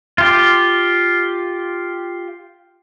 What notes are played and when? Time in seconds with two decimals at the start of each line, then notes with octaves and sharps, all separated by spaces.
0.18 F4 G4